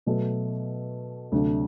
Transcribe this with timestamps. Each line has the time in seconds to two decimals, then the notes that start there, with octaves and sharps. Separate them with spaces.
0.06 B2 F#3 A3
1.32 D2 C3 F#3 A3 D4